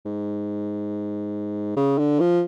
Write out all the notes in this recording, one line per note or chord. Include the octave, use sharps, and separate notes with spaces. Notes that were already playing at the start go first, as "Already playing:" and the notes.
G#2
C#3
D3
F3